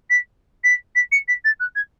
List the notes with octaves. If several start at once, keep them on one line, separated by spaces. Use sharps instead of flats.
B6
B6
B6
C#7
B6
A6
F#6
G#6